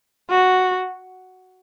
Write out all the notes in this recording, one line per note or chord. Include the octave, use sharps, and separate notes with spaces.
F#4